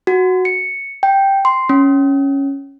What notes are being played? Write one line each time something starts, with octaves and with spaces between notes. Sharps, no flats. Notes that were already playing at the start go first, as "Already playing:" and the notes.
F#4
C#7
G5
C6
C#4